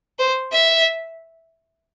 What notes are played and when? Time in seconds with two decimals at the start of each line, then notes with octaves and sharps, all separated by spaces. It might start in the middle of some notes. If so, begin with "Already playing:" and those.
0.19 C5
0.52 E5